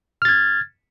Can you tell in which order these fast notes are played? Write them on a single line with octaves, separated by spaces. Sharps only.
F6 A6 G#6